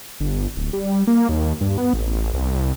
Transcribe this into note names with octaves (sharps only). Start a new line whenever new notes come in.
G1
D1
G3
A#3
D#2
G2
B3
A1
C2